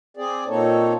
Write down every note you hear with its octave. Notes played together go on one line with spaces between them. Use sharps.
C4 G#4 D5
A#2 A#3 C4 D#4 A4 C#5